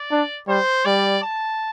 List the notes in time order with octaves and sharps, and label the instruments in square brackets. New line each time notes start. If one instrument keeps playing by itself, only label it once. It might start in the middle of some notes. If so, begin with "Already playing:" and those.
Already playing: [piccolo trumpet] D5
[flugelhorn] D4
[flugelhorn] G3 [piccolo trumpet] C5
[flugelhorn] G3 [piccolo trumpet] D5
[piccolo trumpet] A5